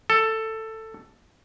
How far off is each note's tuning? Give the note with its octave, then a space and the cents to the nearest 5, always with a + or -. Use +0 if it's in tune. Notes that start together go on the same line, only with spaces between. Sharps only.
A4 +10